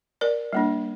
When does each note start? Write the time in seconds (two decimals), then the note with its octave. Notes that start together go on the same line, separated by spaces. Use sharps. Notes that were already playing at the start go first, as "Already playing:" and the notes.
0.21 A#4 D5
0.53 G3 A#3 D4